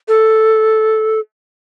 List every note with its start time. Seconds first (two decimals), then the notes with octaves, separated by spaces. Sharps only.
0.08 A4